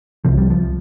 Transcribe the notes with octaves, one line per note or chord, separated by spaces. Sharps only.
C2 C3 F3
G3
F3